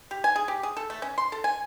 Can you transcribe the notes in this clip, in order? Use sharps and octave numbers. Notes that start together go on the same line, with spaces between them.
G4
G#5
G#4
G4
G#4
A4
A3
C#4
C6
A4
G#5